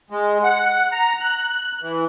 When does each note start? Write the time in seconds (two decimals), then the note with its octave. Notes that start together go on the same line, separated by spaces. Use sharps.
0.10 G#3
0.43 F#5
0.92 A#5
1.20 F#6
1.81 E3